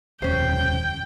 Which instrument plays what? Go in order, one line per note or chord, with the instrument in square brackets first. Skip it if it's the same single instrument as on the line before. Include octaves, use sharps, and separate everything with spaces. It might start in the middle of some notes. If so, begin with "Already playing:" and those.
[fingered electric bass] F1 D#2 [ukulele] C#4 C5 [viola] G5